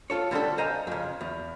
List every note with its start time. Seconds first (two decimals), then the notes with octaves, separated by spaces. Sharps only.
0.10 F4 A4 C#5
0.31 D3 G3 C4 D4 A4
0.58 C5 C#5 D#5 F5 G#5 A#5
0.87 F2 C#3
1.21 E2